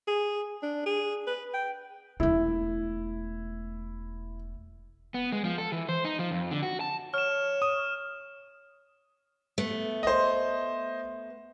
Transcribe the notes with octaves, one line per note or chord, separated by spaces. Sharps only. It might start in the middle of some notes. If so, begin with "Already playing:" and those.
G#4
D4
G#4
B4
G5
E1 A3 E4
B3
G#3
F3
A4
E3
C5
D#4
F3
F2
D3
F#4
A5
C#5 F6 E7
D#6
A3 B3
C5 D#5